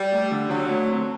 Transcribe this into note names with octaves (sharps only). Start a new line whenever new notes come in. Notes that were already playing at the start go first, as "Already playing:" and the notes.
Already playing: G3
A3
D3
D3 F#3
A3
C4